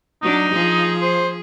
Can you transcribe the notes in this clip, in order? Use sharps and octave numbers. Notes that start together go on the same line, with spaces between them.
F#3 D4 D#4
F3 G#4
C5